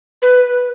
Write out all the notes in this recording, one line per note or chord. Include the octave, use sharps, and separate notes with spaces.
B4